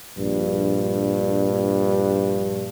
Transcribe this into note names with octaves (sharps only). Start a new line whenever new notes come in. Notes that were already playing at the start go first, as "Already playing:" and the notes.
A#1 G2